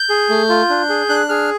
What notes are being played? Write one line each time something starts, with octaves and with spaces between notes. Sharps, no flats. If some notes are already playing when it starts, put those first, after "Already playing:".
Already playing: G6
G#4
A3
F4
D4
G#4
D4 F#6
G#4 F6